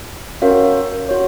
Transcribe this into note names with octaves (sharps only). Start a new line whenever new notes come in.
C#4 F#4 A#4 C#5 F5
F#4 C#5